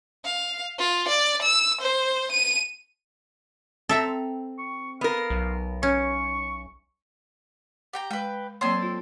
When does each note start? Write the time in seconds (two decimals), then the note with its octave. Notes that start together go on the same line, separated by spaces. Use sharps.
0.25 F5
0.79 F4
1.09 D5
1.43 E6
1.81 C5
2.32 D#7
3.89 C4 A4 E5 A#5
4.59 C#6
5.01 B3 A#4 F5
5.30 B1
5.83 C#4 C#6
7.93 G4 G5 A#5
8.11 G#3 B4 G5
8.61 F#3 A#3 C4 A4 C#5 C6
8.82 F4